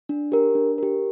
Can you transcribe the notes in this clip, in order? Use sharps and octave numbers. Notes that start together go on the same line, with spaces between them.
D4
G4 A#4
D4
G4 A#4